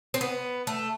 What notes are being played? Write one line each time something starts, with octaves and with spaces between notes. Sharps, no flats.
C4
B3
A3